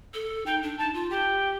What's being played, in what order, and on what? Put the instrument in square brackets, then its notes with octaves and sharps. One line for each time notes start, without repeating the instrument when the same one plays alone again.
[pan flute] A4
[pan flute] D#4 [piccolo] G5
[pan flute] D4
[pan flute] D#4 [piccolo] A5
[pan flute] F4
[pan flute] G4 [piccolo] G5